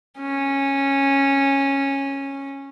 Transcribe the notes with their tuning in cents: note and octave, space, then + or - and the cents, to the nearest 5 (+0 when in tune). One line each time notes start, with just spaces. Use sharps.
C#4 -10